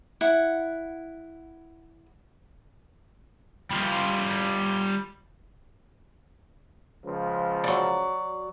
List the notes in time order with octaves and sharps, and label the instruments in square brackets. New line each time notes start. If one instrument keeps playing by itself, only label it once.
[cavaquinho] E4 F#5
[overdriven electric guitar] G3 F4
[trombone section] C#2 F3
[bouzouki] F#3 D5